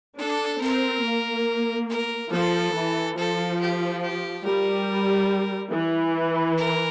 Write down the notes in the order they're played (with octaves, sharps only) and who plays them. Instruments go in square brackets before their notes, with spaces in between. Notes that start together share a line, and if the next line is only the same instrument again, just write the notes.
[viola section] D4 [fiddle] A4
[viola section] C4 [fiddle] A#4
[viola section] A#3
[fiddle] A#4
[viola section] F3 [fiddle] A4
[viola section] E3
[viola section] F3 [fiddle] A4
[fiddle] G4
G4
[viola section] G3 [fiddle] A#4
[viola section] E3
[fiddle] A#4